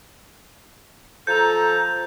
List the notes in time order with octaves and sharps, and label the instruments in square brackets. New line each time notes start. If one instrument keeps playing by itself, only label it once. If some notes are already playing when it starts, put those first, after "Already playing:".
[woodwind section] F3 A4 A#5 [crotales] G6